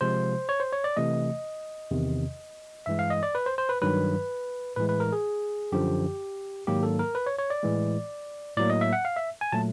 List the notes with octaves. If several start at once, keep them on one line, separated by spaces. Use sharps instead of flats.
C3 F3 G#3 C5
C#5
C5
C#5
D5
C3 E3 A3 D#5
E2 C3 D#3
G2 E3 G#3 E5
F5
D#5
D5
B4
C5
C5
B4
G2 D#3 F#3 B4
A2 E3 G#3 B4
B4
A#4
G#4
F#2 D3 F3 G4
G#2 D#3 F#3 A#3 G4
A4
A#4
B4
C#5
C#5
D5
A2 E3 G#3
A2 F#3 A#3 D5
D#5
E5
F#5
F5
E5
G#5
A#2 F#3 A3 A5